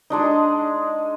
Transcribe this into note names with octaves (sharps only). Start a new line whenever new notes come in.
G#3 D4 D#4